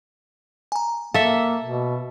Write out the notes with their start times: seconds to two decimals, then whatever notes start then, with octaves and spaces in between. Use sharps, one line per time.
0.72 G#5 A#5
1.14 A#3 A4 E5 F5
1.64 B2